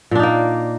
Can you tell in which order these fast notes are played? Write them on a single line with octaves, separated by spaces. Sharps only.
A#2 D4 D#4 A#3